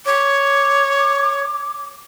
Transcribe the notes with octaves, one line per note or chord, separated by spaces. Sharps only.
C#5 D6